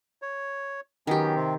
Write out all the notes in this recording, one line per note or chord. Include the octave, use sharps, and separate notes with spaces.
C#5
D#3 F#3 B3 C#4 G4
C3 C4